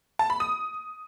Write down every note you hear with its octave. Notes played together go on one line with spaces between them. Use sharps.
A5
B5
D#6